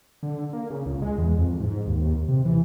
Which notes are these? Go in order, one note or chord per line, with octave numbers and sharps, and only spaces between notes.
D3
A#3
C#3
C#2
G#3
E2
F2
G#2
D#2
C3
E3